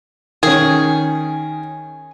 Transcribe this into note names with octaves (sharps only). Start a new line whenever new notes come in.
D#3 C#4 G#4